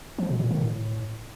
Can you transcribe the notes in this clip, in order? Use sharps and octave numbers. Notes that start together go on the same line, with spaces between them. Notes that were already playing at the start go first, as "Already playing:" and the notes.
F3
B2
A#2
D#3
A2